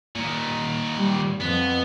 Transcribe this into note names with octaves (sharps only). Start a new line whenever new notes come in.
A#2 D#3
G3
F2 B3